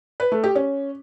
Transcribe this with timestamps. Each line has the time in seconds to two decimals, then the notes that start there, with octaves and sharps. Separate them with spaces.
0.20 B4
0.32 A3
0.43 G4
0.55 C#4